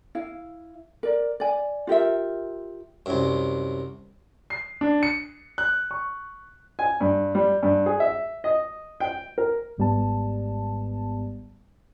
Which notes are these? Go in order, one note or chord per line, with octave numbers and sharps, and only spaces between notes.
E4 F5
A#4 D5
D5 G#5
F4 G4 A#4 E5
C2 F#2
C7
D4
C#7
F#6
C#6
G#5
G2
G3
G2
G#4
E5
D#5
G5
A#4
G#1 G#2 G3 B3 A5